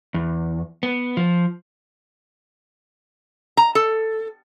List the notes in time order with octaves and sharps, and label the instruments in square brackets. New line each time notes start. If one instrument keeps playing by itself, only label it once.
[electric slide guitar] E2
B3
F3
[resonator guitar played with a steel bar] A#5
A4